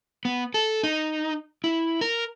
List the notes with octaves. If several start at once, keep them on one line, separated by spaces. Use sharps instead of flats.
B3
A4
D#4
E4
A#4